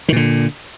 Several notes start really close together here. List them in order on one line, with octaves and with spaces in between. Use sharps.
D#3 A#2 D3